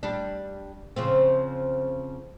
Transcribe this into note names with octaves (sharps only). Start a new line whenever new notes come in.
G3 D4
C#3 F3 C4